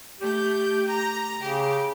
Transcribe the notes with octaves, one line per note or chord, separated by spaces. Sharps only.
A3 G4 G6
A#5
C#3 G4